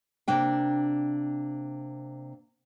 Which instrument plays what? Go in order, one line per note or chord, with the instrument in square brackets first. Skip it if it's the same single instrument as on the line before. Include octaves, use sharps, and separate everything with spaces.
[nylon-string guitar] C3 A#3 D4 G5